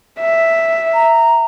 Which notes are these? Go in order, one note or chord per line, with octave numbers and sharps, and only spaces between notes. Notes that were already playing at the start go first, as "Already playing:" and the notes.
E5
A#5